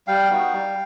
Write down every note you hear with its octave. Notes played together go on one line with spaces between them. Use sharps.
G3 F5 G5
B3 D#4 F#4
G3